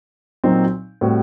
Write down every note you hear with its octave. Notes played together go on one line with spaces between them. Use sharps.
A#2 F#3 C4 D#4
A2 G3 C4 F#4